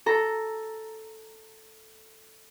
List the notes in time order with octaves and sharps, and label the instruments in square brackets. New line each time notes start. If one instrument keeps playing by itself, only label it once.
[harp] A4 A#5